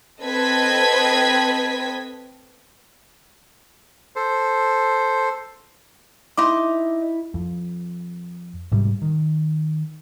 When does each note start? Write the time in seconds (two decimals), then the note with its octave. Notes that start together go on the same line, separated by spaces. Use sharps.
0.23 C4 A4 B4 D#5 G#6 B6
4.16 A4 C5
6.37 D#4 E4 C6 D6
7.34 F2
8.72 G#2 C3 G3
9.02 D#3